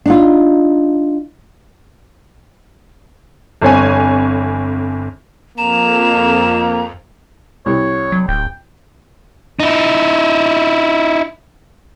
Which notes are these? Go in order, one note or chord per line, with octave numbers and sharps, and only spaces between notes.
D4 D#4 F4
G1 F2 C#5 G#5
F2 A#3 A#5 E7
C2 C#5
F#3
D1 G5
D#4 E4